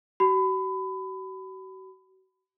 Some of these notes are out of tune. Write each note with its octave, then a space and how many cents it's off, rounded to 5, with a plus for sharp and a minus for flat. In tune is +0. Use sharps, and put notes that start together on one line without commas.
F#4 +40 B5 +25